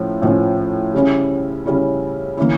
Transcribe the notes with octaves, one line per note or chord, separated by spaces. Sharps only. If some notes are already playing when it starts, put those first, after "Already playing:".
Already playing: A2 F3 C#4
A2 F3 C#4
C#3 G3 C#4 E4
C#3 G3 C#4 E4
E3 A#3 C#4 E4